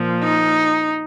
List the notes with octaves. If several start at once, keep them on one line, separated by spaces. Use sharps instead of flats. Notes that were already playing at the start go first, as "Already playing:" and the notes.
Already playing: A#2 F3
D#4